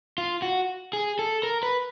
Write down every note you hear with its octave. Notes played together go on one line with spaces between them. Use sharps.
F4
F#4
G#4
A4
A#4
B4